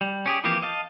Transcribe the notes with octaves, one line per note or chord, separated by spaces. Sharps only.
G3
C#4 G4 G#4
E3 F3 A#3 C4 G4
D#5 F5 A5